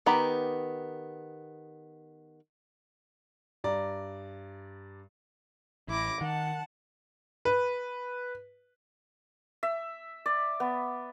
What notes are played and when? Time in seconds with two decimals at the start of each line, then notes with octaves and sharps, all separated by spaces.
0.06 D#3 B3 G4 A#5
3.64 G2 D5 A#5
5.88 A1 E4 D6 A#6
6.21 D#3 F#5 A5
7.45 B4
9.63 E5
10.26 D5
10.60 B3